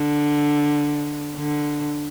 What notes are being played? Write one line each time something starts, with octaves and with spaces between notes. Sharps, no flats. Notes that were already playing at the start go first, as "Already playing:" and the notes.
Already playing: D3
D3